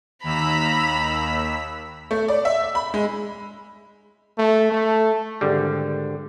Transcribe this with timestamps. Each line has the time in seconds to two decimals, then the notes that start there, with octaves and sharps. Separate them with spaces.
0.24 D#2 A#5 B5 E6 B6
2.11 A3
2.28 D5
2.45 E5
2.75 B5
2.94 G#3
4.38 A3
4.72 A3
5.41 G#1 D3 G3